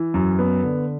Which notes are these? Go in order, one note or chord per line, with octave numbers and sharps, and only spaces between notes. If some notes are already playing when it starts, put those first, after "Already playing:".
Already playing: E3
F#2
B3
D3